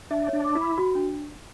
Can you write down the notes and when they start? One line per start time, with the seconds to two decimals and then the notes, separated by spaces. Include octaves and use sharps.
0.11 D4 E5
0.28 C#5
0.33 D4
0.44 D6
0.55 E4
0.61 B5
0.78 F#4
0.95 D4